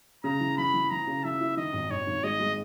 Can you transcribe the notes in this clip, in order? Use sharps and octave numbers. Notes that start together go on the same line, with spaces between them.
C#3 A#5
E3
E3 B5
E3
E3 A#5
C#3
E3 E5
E4
D#3 D#5
G#1
G#1 C#5
G#1
G#3 D#5
G#3